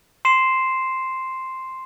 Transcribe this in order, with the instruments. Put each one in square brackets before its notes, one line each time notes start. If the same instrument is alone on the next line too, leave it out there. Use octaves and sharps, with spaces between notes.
[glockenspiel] C6 C7 E7